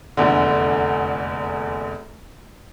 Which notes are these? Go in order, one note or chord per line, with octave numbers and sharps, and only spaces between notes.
F1 A#1 E2 D3